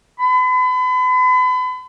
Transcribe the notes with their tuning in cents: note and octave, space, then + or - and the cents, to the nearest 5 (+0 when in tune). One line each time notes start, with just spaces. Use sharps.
B5 +40